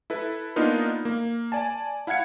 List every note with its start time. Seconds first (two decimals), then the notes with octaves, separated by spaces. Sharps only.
0.10 E4 A4 B4
0.56 A#3 B3 D4 D#4 F4 A#4
1.05 A#3
1.52 D5 G#5 A5
2.07 E4 F5 F#5 G#6 C#7